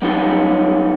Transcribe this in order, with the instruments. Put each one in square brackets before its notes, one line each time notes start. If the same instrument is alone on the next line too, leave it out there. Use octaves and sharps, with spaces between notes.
[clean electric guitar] F#3 G3 B3 C#4 D#4 F4